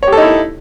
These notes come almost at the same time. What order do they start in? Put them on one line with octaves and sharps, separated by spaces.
C#5 G4 A4 D#4 E4